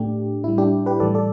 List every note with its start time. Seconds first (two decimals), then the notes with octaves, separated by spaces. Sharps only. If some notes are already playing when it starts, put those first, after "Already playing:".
Already playing: A2 A3 D4 G4
0.44 A2 G3 E4
0.58 D4 G4
0.86 G4 B4
1.00 A2 E3 G3 A4 D5
1.15 A4 D5